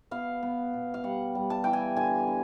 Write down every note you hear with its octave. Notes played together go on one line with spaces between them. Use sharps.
B3 F5
B3
B2
F5
G3 F#5
G3
A5
E3 G5
G#5
D3 G#5
D3